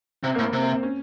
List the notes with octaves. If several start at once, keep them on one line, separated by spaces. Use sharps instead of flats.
C3 C4
A2 A#3
C3 C4
A#3
C4
C#4